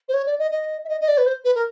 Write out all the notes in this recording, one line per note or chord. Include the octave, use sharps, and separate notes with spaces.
C5
C#5
D5
D#5
D#5
E5
D#5
D#5
D5
B4
C5
B4
A#4